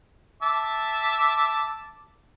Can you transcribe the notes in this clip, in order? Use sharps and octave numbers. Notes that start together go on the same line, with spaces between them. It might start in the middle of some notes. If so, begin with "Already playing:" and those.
E5 A5 D6